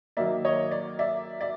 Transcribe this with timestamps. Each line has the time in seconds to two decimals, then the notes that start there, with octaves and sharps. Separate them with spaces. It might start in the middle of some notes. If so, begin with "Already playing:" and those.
0.17 D#3 F#3 A#3 D5 E5
0.45 C#5 D#5
0.71 D5
0.99 D5 E5
1.41 D5 E5